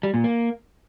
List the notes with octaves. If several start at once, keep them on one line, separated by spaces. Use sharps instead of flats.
G3
A#2
A#3